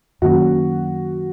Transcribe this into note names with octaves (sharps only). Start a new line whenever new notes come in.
F#2 D#3 A#3 C#4 F#4